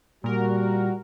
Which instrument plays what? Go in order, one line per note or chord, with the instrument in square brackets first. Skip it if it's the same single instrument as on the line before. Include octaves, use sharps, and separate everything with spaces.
[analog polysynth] A#2 A#4 [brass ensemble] G3 F#4